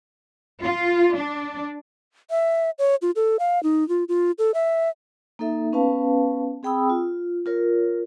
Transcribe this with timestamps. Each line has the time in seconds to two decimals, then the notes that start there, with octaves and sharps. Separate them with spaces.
0.63 F4
1.15 D4
2.30 E5
2.79 C#5
3.02 F4
3.16 A4
3.39 F5
3.63 D#4
3.89 F4
4.08 F4
4.38 A4
4.54 E5
5.39 A#3 D#4 A4 E5
5.73 B3 C#4 B4 F5 A5
6.63 C4 G#4 G5 B5 D#6 E6
6.90 F4
7.46 F4 A#4 C#5